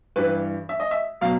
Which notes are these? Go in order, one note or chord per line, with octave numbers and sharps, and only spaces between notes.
G2 E3 G3 B4
E5
D#5
E5
B2 F#3 F5